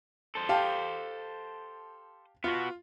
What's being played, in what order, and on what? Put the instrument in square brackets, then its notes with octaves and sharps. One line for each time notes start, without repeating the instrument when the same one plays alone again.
[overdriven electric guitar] A4 C5
[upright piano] G4 F5 A5
[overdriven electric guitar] B3 F#4 [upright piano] F4